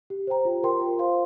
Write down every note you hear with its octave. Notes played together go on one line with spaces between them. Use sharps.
G4
C5 G5 A#5
F4
A#4 G5 C6
F4
C5 F5 C6